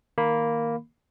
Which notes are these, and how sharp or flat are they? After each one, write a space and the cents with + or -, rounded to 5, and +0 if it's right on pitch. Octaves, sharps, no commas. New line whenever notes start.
D#3 +20 A#3 +0 B5 +0